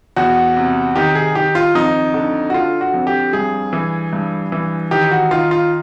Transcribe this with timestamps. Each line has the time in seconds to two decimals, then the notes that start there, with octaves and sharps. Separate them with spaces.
0.16 E2 F#4
0.57 C3
0.96 D#3 G4
1.15 G#4
1.35 D#3 G4
1.55 F4
1.75 F2 D#4
2.14 D3
2.50 F#4
2.54 D3 F4
2.81 F#4
2.94 F2
3.07 G4
3.33 G2 G#4
3.73 E3
4.13 G2
4.52 E3
4.91 D#3 G4
5.11 F#4
5.31 D#3 F4
5.51 F4